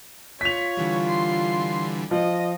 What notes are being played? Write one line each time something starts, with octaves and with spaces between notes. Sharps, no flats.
F4 C#5 B6 F7
D3 E3 G3
C6
F3 D#5